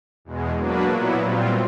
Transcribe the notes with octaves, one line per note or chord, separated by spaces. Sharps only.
E2 B2 G#3
F#3 A#3 D4 F#4 B4
A#2 F#3 B3 E4
A#2 G3 C4 F4